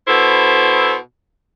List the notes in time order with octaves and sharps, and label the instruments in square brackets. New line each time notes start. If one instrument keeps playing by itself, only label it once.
[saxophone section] B2 E4 A4 C5